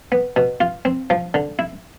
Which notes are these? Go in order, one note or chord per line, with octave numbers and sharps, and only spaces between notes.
B3
B2
F4
C4
F3
D3
E4